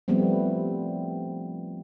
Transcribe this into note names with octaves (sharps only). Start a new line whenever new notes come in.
F3 G3 A3 B3 C4